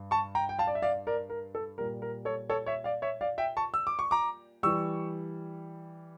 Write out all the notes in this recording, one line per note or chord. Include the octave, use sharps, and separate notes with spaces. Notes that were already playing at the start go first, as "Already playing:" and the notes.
Already playing: G2
A5 C#6
G5 A#5
G5
F5 A5
D5
E5
D5 F5
A#4 D5
A#4
A4
A#2 G3 A#4
A#4
A4 C#5
A4 C#5
C#5 E5
D5 F5
C#5 E5
D5 F5
E5 G5
A5 C#6
E6
D6
C#6
A#5 D6
E3 G3 C#6 E6